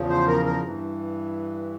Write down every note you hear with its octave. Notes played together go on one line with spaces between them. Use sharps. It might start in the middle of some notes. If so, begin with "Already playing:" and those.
Already playing: E2 C#3 F3
C5
A#4
A#4
G2 E3